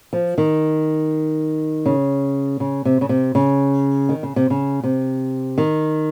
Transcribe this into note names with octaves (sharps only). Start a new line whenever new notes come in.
F3
D#3
C#3
C#3
C3
C#3
C3
C#3
D#3
C#3
C3
C#3
C3
D#3